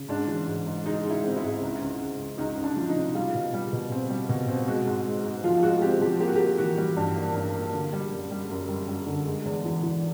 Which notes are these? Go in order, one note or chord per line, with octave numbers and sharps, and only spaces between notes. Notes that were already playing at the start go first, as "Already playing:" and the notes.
Already playing: C#3
G#2 D4
E3
G#2
G#2
G#3 D#4
G#3
E4
C4
E4
G#2
C#2
C#2
C#2
C#2
C#2 D#4
C#2
D4
F3
D#4
C3
G3 F4
B2
G3
B2
C4
G3
B2
C4
G#3 F#4
G#2
G#3
G#2
F3 F4
G#3 F#4
C4 G4
F3 G4
A#3 G4
F#4
G4
A#3
E3 F#4
G3
G2
A#3
G2
A#3
D3
G3
F#2
G3
F#2
G3
G3
D3
G#3
E2
E3
E3